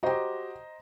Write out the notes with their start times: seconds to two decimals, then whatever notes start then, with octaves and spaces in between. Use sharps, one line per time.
0.03 F#4 G4 C5 D#5 A#5